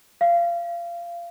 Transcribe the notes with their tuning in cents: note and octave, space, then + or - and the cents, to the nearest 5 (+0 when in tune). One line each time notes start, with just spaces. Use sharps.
F5 -25